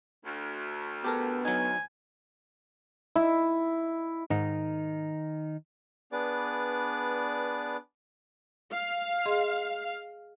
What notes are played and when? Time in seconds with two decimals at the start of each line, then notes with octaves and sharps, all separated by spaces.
0.25 D2
1.04 B3 G4 A4 A#4
1.45 F#3 D#4 G#5
3.16 E4
4.30 G#2 D#3 D#4
6.12 B3 D4 G#4 B4 D5 D6
8.72 F5
9.26 G#4 D#5 C6